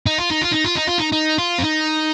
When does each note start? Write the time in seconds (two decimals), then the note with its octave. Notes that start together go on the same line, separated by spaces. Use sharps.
0.06 D#4
0.18 F4
0.30 D#4
0.42 F4
0.52 D#4
0.65 F4
0.76 D#4
0.87 F4
0.98 D#4
1.12 D#4
1.39 F4
1.59 C4
1.64 D#4